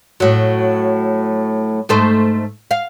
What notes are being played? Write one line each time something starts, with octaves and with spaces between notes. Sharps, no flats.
A2 F#3
G#2 A3 C5
F5